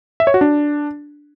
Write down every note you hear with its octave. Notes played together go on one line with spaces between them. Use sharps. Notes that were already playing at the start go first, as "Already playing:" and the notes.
E5
C#5
F#4
D4